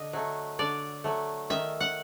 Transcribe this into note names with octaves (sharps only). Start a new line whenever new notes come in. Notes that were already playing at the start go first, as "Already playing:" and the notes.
Already playing: D3 D#5
F#3 A3
D3 D5
F#3 A3
D#3 E5
F#5